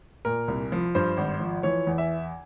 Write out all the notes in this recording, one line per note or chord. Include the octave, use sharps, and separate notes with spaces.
A#2 A#4
C2
F3
G2 C5
G#1
F3
E3 C#5
E2
E5